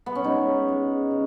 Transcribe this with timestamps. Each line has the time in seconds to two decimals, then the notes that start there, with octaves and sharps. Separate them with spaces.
0.06 B3
0.15 C#4
0.24 G#3 D#4
0.69 G#3
1.11 C#3